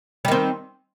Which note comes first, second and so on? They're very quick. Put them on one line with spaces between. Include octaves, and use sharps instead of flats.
G3 D#3 C4